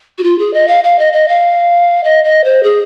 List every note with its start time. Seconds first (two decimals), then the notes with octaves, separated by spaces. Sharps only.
0.18 F#4
0.23 F4
0.39 G#4
0.54 D#5
0.68 F5
0.84 F5
0.99 D#5
1.13 D#5
1.28 F5
2.04 D#5
2.24 D#5
2.44 C5
2.63 G#4